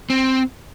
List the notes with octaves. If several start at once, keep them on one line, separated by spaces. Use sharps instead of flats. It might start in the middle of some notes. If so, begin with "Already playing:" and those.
C4